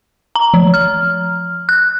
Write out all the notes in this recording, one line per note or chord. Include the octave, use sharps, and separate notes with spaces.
A#5
F3
F6
F#6